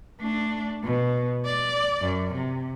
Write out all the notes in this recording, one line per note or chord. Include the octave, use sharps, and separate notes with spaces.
A3 D4
B2
D5
F#2
C3